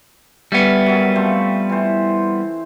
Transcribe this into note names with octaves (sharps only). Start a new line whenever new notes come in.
G3 B3 C#4 E5
F#2 F#3
F3 A3 C4
E3 C5